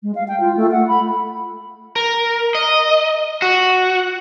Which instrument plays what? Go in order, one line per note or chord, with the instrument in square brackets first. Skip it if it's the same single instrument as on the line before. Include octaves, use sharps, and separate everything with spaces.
[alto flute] G#3
F5
G5
F4
A3
F#5
B5
[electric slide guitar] A#4
D#5
F#4